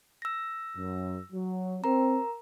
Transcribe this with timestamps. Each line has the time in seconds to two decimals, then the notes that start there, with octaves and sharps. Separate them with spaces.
0.22 E6 A#6
0.76 F#2
1.32 F#3
1.84 C4 A#4 A#5